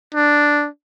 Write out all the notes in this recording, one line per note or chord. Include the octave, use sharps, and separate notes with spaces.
D4